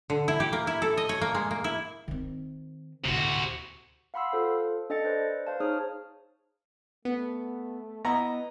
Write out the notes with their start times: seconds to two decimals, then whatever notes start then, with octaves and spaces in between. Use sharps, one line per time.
0.10 D3
0.28 E4
0.40 G4
0.53 A#3
0.67 E4
0.82 A4
0.97 D#5
1.09 C#5
1.21 A#3
1.35 G#3
1.51 A#3
1.64 E4
2.08 D#3 C4
3.05 D2 A2 C3 F#4
4.14 F5 F#5 B5 C6 E6
4.32 F4 A4 C5 F5
4.90 D4 A4 D#5 G5 A6 C#7
5.05 B4 C5 D5
5.47 C5 F5 A5
5.60 D#4 G#4 C#5 D#6 F6
7.05 A3 B3
8.05 B3 E4 D#5 A#5